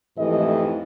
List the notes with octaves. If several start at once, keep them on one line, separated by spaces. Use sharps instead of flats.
F2 G#2 E3 A3 G4 D#5